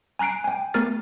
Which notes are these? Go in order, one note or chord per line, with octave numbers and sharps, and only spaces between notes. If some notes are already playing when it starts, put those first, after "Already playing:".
G#5 A#5 F#6 C7 D7
G5 G#5
A3 B3 A#4 F6 A6